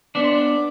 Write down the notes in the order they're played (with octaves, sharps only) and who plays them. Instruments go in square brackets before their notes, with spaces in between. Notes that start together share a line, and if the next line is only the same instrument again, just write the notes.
[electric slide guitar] B3 D4 [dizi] D6
[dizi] C6
D6